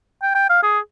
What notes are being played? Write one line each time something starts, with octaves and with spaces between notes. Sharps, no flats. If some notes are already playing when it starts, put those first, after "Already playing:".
G5
G5
F5
G#4